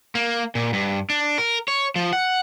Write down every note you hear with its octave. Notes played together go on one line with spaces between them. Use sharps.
A#3
A#2
G2
D4
A#4
C#5
F3
F#5